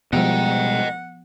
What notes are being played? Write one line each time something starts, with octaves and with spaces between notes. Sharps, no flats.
B2 F3 G3 G#3 B3 D#5 F#5 G5